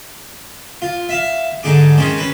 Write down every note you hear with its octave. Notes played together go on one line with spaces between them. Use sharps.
F4
E5 F5
G#2 D3 D#4 G#4 D6
D#3 G#3 C4 C#4 G#4
C#4 B4